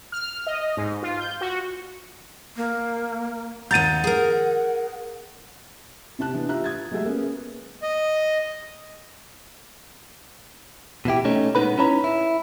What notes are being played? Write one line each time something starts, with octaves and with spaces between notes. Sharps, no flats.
F6
D#5
G#2
F4
G6
F#4
A#3
D#2 F#5 A#5 G6 A6 D#7
G#4 A#4
C3 G4 A5 F#6
E3 B3 D4
F4 G4 E5 A#5 F#6
D#6 G#6 A6
F#3 G#3 A3 G4 G#4 E5
A#3 B3 C#4 G#4
D#5
B2 E3 E4 G4
A3 C#4 D#4
A#2 G#3 B3 D#4 B4 B5
C#4 D#4 E4 C#5 A#5 B5
E4